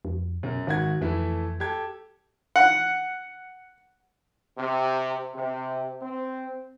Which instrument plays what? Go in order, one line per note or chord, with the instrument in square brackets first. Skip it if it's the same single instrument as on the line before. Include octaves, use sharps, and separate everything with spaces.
[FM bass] F2
[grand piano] F#2 [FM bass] B2
[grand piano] G#1 F#4 G#6 [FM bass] D#3
[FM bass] F2 [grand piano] E3 A3 E4
[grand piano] G4 A4 G#6
[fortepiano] F#5
[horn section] C3
C3
C4